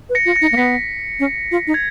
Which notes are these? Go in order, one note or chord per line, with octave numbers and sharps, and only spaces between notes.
B4
A#6 C#7
F4
A#6 C#7
D#4
A#3
B3 B6
C#4
F4
D#4
G#6